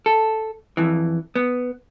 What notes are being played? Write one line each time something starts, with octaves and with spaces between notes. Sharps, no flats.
A4
F2 E3
B3